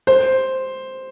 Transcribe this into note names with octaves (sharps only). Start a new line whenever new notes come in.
C5